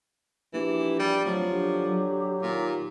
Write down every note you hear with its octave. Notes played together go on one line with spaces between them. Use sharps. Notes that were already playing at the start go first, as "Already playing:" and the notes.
A#1 E3 G4
G3
D1 F3 F#3
D3 G4
F#3
D#2 A#2